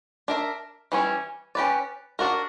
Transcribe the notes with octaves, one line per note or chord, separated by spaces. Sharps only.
D4 A#4 E5
E3 G3 C#4
C#4 G4 B4 D5
D4 F#4 A#4